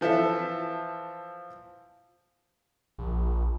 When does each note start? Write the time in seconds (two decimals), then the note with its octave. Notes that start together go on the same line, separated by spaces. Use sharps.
0.01 E3 F3 A4 E5
2.98 A#1